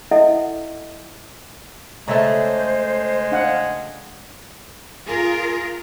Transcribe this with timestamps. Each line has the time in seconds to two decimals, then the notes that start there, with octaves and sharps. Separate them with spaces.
0.11 E4 A4 D#5 E5 F#5
2.08 C#3 G#3 A3 A4 C5 A#5
3.32 D4 F5 F#5
5.06 F4 G#4 A#4